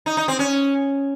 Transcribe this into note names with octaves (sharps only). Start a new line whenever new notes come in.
D#4
D#4
C4
C#4